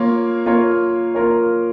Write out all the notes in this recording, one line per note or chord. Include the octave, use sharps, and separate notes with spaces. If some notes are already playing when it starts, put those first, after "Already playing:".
Already playing: A#3 F4 A#4 C#5
A#3 F4 A#4 C#5
A#3 F4 A#4 C#5